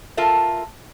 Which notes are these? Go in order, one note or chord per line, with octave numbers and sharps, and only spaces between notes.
F4 A4 A#4 E5